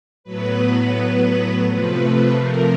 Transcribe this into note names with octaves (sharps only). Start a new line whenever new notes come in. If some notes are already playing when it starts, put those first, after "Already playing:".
A2 F#3 B3 B4
C3 F3 A3 B4
A#4